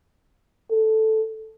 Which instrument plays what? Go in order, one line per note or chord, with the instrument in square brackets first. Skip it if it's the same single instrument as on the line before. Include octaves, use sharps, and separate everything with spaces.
[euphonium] A4